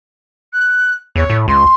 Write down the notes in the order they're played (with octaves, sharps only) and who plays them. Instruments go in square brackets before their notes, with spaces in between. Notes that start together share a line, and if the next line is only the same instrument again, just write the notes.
[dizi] F#6
[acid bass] E2 [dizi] C#5
[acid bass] A2
[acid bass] C#2 [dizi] C6